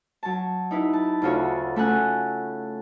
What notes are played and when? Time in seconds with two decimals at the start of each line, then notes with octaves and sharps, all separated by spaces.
0.23 F#3 A5
0.71 D#4 E4 B4
0.93 A5
1.22 D2 C#3 F4 F#4 A4 C#5
1.76 A3 C#4 A4 F#5 G#5 F#6